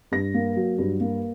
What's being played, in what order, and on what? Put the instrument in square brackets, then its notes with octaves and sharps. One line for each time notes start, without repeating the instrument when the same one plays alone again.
[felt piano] G2 A#6
A#3
F#3
G2
A#3